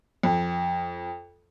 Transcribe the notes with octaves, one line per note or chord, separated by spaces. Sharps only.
F2